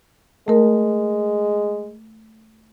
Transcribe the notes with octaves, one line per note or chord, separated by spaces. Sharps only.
G#3 A3 A#4